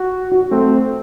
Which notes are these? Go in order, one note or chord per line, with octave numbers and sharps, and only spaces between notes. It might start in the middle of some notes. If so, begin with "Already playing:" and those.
Already playing: F#4
F#4
A3 C4